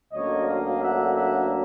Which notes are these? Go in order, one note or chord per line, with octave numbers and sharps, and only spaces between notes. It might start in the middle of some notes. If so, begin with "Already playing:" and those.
D2 D3 F#3 A#3 C#4 C#5 D#5
D#5 F5
E5 F#5
E5 F#5